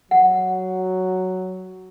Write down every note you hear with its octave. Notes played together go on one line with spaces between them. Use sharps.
F#3 F#5